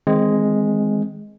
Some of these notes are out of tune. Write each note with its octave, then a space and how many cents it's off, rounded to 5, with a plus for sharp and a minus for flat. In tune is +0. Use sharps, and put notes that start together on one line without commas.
D#3 +40 G#3 +0 C4 +0